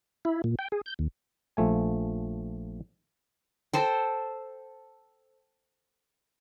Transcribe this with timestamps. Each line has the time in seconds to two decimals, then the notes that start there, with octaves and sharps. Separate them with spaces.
0.25 E4
0.44 A#2
0.59 G5
0.72 G#4
0.86 G6
0.99 D#2
1.57 A#1 F3 A3 G#5
3.73 A4 C5 G5